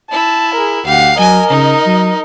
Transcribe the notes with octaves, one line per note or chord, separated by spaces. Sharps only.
E4 A5
G#4 A#4
D2 G4 F5 F#5
F#3 A#4 D#5 G#5
C#3 D#4
F#3